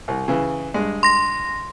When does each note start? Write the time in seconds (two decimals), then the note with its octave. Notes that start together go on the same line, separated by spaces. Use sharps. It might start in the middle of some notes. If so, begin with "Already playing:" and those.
0.08 C2
0.28 C#3 E3
0.74 G2 G#3
1.03 C6 A#6